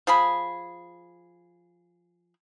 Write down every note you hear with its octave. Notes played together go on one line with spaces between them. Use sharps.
F3 G#4 B5